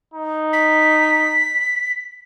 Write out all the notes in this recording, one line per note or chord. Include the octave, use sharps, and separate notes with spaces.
D#4
B6